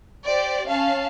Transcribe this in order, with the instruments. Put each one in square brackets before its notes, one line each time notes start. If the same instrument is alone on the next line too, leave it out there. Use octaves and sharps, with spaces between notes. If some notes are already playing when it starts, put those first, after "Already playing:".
[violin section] G4 C5 D5
C#4 F5 A5